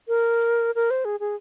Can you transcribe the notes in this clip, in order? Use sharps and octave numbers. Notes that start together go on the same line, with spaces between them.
A#4
A#4
C5
G#4
G#4